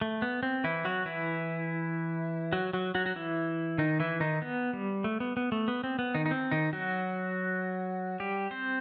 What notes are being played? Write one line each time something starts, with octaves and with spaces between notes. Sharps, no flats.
A3
B3
C4
E3 E4
F#3 F#4
E3 E4
F#3 F#4
F#3 F#4
F#3 F#4
F#4
E3 E4
D#3 D#4
E3 E4
D#3 D#4
B3
G3
A3
B3
B3
A3
B3
C4
B3
D#3 D#4
D#4
C4
D#3 D#4
F#3 F#4
G3 G4
C4 C5